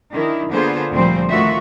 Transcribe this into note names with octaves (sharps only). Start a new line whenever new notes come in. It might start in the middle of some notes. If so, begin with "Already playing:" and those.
D#3 D4 E4
D3 A#3 B3 F4 G#4 C5
D2 A#2 F3 G3 C4 C5
A2 D#3 F4 F#4 E5